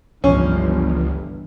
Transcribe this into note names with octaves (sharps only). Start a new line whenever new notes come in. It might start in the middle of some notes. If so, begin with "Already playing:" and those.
G1 C#2 E3 F3 C#4